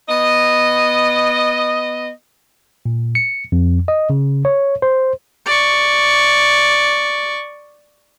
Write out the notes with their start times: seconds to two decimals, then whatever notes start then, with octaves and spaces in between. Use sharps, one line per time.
0.09 B3 D#5
2.86 A#2
3.15 C#7
3.52 F2
3.88 D#5
4.10 C#3
4.45 C#5
4.82 C5
5.46 D5 C#6